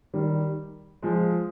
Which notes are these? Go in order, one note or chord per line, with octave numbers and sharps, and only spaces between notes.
D#3 G3
F3 G#3